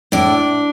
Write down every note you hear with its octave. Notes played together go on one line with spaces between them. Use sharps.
A2 D4